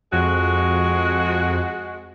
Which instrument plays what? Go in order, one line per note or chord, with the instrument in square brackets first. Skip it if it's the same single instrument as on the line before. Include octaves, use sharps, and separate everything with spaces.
[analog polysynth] F2 [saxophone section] G#3 F#4